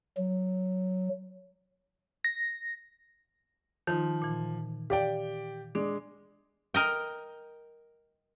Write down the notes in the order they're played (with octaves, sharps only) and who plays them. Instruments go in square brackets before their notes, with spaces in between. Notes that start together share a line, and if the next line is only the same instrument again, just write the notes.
[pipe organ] F#3
[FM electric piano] A#6
[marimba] D#3 D#4 [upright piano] F3
[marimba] A#2 E3
[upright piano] G4 D5 G5 [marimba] F5
[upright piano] G#3 [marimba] D4 D5 D6
[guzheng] A#4 D#5 G5